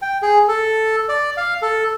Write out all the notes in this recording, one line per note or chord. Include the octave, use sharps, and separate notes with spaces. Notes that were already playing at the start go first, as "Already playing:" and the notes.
G5
G#4
A4
D5
F5
A4